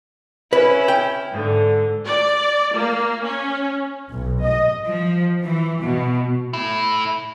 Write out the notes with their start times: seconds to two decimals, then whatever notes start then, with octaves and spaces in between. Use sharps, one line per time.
0.53 C#4 E4 B4
0.88 G5
1.32 G#2 D3
2.06 D5
2.76 A#3
3.24 C#4
4.10 B1
4.43 D#5
4.87 F3
5.43 E3
5.82 B2
6.53 A3 E4